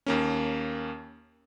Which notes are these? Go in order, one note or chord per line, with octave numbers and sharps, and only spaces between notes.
D#2 A#3 C#4